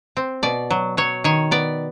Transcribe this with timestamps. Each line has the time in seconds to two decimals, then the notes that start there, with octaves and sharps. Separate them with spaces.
0.17 C4
0.43 B2 D5
0.71 F#3
0.97 F#3 C#5
1.24 D#3 C#5
1.51 B3 D5